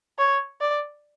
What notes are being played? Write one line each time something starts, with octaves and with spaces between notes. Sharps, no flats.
C#5
D5